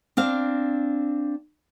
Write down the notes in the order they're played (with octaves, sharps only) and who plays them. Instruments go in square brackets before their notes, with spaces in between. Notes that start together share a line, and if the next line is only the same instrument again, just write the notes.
[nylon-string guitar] C4 D4 F5